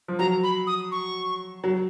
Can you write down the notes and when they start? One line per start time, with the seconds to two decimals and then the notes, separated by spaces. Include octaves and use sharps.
0.08 F3
0.19 F#3 A#5
0.43 B5
0.67 D#6
0.92 C#6
1.64 F#3